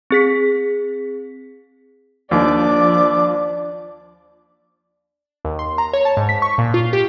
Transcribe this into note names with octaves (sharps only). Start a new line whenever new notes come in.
C4 G#4 B6
D#2 F3 D4 D6
D#2
C6
A#5
C#5
A5
G#2
B6
C#6
A#2
F4
G4